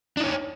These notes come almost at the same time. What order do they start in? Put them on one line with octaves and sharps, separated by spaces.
D4 D#4 C#5